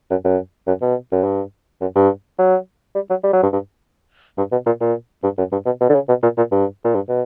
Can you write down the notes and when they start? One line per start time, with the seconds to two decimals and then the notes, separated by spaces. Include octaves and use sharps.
0.11 F#2
0.25 F#2
0.68 F#2
0.82 B2
1.12 F#2
1.24 G2
1.82 F#2
1.96 G2
2.39 F#3
2.95 G3
3.10 F#3
3.24 G3
3.33 F#3
3.43 G2
3.53 G2
4.38 G2
4.52 B2
4.66 A#2
4.81 A#2
5.24 G2
5.38 F#2
5.52 G2
5.66 B2
5.81 B2
5.90 D3
5.95 C#3
6.09 B2
6.23 A#2
6.38 A#2
6.52 G2
6.85 A#2
6.95 G2
7.09 B2